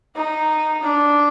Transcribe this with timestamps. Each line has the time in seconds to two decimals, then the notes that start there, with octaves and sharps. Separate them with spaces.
0.15 D#4
0.83 D4